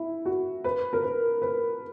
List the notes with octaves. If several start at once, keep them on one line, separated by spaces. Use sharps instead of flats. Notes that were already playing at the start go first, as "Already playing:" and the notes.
Already playing: E4
F#4
B4
A#4
B4
B4